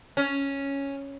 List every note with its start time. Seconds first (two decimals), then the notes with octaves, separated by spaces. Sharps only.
0.17 C#4